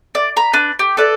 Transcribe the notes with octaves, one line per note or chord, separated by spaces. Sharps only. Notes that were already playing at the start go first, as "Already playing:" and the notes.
D5
A#5 B5
D4 B4
G4
A4 B4 D5